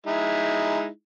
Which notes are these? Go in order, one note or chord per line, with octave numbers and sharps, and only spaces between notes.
G#3 D#4 E4